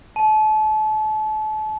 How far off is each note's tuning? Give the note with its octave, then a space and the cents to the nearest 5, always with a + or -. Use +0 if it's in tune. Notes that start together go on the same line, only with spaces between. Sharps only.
A5 -35